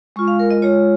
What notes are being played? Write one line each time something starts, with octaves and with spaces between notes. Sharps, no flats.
G#3 F4 C#6
F5
A#4
D#5
G#3 F4 C#5